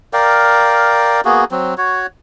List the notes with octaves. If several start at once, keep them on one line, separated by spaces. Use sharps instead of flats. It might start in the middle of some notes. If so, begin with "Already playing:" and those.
A#4 D5 F5 G5
A#3 B3 F#4 G#4
F#3 C4
F#4 C#5